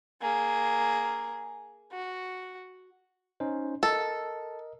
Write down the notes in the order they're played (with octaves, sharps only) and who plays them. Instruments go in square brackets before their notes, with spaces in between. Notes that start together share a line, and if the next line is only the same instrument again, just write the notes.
[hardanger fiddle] A#3 G#4
F#4
[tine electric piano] C#4 D#4 C5
[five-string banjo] A4 [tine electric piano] A#4 D#5